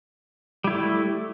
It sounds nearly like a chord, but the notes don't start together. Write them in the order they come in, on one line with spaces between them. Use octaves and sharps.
G3 E4 A3